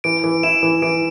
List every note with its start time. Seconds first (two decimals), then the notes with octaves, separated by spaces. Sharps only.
0.04 E3 D7
0.24 E3
0.43 E4 E7
0.63 E3
0.82 E3 D7